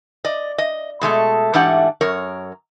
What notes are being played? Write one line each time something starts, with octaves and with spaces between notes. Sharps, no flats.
D5 D#5
D#5
B2 G#3 A3 A4
G#2 E3 A3 D4 G4 F#5
F#2 A#4 C#5